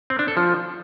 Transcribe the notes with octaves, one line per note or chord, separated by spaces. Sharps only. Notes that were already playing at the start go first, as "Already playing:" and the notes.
C4
D4
A4
F3